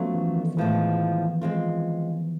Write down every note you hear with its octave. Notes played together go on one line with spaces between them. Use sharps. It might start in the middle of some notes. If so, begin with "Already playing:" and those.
Already playing: F3 F#3 A3 B3 C#4 F4
E3
D#3
A2 E3 F3 G#3
G#3 C4 F4